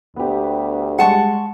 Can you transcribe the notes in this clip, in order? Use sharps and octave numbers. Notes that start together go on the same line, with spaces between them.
D2 B3 G4
G3 G#3 F#5 A5 C#6